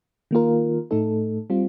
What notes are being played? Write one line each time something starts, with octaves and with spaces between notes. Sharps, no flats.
D#3 A#3 F4 A#4
A2 A3 D#4 A4
G3 C4 F4